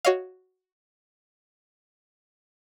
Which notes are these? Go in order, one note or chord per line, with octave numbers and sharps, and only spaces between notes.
F#4 C#5 D#5 F5